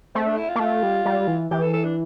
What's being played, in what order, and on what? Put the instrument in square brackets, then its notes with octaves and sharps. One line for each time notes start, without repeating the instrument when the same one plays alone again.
[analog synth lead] A3 [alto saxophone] C4
[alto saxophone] D4
E4
F4
[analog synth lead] A#3
[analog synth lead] A3 [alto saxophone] F4
[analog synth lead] G3
G3
E3
[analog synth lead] E3 [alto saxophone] G4
[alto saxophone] A4
A4
D4